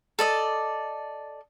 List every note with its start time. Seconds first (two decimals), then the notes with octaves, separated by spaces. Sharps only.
0.19 A4 D5 D#5